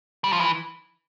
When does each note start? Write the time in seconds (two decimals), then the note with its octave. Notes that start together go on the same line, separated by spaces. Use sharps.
0.24 G3
0.33 F3
0.40 E3